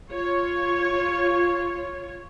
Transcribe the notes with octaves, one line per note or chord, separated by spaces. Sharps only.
F4 C#5